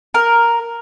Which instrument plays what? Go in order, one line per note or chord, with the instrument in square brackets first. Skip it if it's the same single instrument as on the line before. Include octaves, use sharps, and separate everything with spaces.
[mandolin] A#4